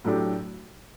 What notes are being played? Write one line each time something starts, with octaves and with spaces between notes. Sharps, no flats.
A2 F#3 A3 D4 G4